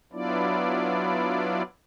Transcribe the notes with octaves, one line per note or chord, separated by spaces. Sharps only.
F#3 B3 D4 E4 F4 D5